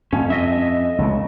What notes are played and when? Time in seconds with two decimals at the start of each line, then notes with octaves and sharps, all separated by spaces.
0.13 F2 C#4
0.30 D#5 E5
0.98 C#2 C#3